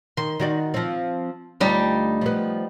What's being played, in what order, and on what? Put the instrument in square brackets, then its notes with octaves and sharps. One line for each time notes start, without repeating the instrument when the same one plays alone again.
[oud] D#3 [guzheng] C6
[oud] D#3 F#4 D5
F3 C4
[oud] D2 F4 [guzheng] G3 D#4
[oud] F3 B3